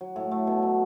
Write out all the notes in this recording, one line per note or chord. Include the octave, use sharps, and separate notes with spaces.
F#3
A2
A3
B2
F#3